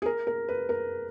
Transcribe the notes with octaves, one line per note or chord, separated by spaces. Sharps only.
G#4
A#4
A#4
B4
A#4